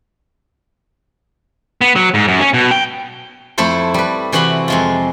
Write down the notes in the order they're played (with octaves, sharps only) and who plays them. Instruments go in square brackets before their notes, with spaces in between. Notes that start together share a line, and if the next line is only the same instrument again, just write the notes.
[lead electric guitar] B3
F#3
G#2
F#2
C#4
B2
G5
[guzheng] F2 A3 E4 A4 C5
G3 B4
C3 E3 F#4 F#5 B5 C6
F2 G#3 F4